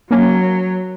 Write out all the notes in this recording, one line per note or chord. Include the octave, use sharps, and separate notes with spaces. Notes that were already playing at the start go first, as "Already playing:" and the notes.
F#3 A#3 C#4